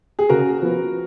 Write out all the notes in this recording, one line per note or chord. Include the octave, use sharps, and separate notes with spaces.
G#4
C#3 F#4 A#4
F3 B3